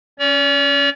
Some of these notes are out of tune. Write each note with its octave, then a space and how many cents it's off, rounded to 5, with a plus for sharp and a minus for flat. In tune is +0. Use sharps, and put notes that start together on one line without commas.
C#4 +0 D5 -45